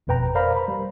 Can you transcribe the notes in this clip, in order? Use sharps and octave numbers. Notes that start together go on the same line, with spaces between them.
G1 F2 B2 B4 G5 A#5
A#4 C5 D5 F5 A#5 B5
C5 B5
G3